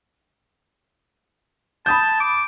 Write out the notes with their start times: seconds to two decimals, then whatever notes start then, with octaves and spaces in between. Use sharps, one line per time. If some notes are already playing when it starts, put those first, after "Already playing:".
1.86 A5 B5 D#6 G6
2.20 D6